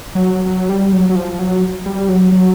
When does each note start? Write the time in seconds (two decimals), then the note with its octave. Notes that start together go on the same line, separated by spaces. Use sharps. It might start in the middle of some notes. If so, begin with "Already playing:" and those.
0.15 F#3
0.46 F#3
0.69 G3
0.92 F#3
1.09 F#3
1.15 F3
1.39 F#3
1.86 G3
2.09 F#3
2.32 F#3